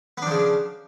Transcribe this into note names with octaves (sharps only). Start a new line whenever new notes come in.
C#3 F3 B3 D4